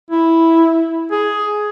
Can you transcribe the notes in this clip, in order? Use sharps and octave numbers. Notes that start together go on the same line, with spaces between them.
E4
G#4